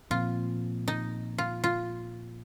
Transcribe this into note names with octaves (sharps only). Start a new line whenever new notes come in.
A#2 F3 C4 F4
D#4
F4
F4